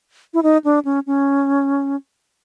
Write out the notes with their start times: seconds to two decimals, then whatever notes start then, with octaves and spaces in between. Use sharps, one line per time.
0.34 E4
0.43 D#4
0.64 D4
0.85 C#4
1.07 C#4